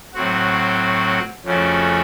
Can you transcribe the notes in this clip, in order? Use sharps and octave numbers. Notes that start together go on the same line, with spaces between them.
A2 F#3 C4 F#4
F2 C#3 A3 C#4 F#4